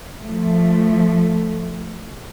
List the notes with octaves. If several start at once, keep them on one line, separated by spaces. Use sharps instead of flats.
F3 A3